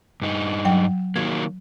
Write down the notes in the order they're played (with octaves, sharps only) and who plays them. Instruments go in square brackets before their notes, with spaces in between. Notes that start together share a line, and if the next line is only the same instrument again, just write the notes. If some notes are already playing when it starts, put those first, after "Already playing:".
[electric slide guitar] G2 D#4
[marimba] F#3 G5
[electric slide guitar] D#3 F#3 A#3 [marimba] G#6